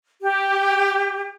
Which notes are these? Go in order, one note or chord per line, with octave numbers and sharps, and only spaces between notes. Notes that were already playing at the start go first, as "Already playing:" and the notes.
G4